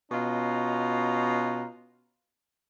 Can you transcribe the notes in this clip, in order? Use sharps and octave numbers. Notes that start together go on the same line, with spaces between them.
B2 C#4 F4 D#5 A#5